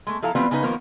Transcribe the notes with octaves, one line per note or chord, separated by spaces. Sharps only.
G#3 A3
F3 E4 A4 F5 A#5
E3 F#3 G3 B3 C4 F4
C#3 C#4 D#4 B4
D#3 F3 A#3 B3